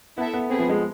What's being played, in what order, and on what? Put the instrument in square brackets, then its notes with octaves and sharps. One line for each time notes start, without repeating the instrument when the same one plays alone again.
[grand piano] B3 [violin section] E4 A4 E5
[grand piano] B3
[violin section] A3 C4 G#4 B4
[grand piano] F3
G#3